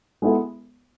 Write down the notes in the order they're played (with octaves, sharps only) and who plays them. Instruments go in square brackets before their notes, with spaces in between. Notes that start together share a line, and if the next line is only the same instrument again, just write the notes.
[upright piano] G#3 B3 E4 A4